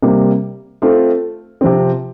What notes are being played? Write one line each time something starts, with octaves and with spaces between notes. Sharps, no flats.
C3 G3 A#3
A3 C4 F4
C3 F3 C4